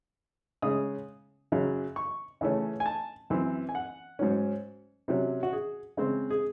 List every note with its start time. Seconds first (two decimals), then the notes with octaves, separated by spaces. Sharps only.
0.62 C#3 G#3 C#4 D#6
1.52 F#2 C#3 F#3
1.96 C#6
2.41 C#3 E3 A3 C#4
2.80 G#5
2.86 A5
3.30 F#2 E3 C4
3.69 G#5
3.75 F#5
4.19 G#2 F#3 C#4
5.08 C3 F#3 C#4
5.43 F#4
5.53 G#4
5.97 C#3 G#3 C4
6.31 G#4